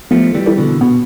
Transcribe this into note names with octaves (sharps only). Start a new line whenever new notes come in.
F3 A3 B3
E3 G3
E4 A4 D5
B2 D3
B2 B3